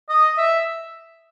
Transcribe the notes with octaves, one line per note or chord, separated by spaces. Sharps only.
D#5
E5